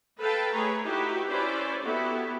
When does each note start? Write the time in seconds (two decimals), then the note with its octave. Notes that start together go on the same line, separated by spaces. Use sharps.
0.18 A4 B4 F5 G5 A5
0.51 A3 G#4 B4 C#5 A#5
0.82 D#4 E4 F#4 G4 B4
1.27 C#4 E4 B4 C5 D5
1.80 B3 E4 F#4 G4 A4